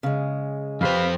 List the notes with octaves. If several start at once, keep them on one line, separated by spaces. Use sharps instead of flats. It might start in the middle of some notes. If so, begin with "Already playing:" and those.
C#3 G#3
F2 G4 B4 C5 F5